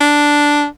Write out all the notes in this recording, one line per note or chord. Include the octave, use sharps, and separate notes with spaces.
D4